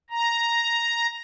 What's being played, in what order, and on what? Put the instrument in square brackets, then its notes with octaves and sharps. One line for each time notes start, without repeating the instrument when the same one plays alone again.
[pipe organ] A#5